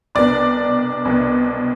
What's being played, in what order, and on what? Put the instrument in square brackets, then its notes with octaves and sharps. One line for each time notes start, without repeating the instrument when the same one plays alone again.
[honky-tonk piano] C2 B2 B3 D4 D5
C2 B2 B3 D4